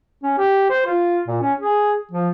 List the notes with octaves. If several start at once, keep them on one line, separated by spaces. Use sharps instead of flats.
C#4
G4
C5
F4
A#2
C#4
G#4
F3